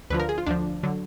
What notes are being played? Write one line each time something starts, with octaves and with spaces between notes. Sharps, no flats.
D2 D3 F3 B4
A#4
G#4
F4
D2 D3 F3 D4
D3 F#3